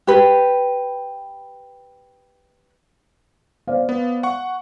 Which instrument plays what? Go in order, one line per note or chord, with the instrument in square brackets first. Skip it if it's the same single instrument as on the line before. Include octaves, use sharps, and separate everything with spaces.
[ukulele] G4 B4
[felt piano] C5 D5 F5
[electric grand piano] B3
F#5 C#6